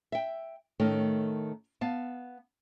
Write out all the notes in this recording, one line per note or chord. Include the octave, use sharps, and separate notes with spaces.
E5 G5
A2 D#3 A3 C#4
B3 F5 A5